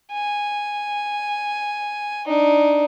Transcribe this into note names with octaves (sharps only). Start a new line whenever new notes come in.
G#5
D4 D#4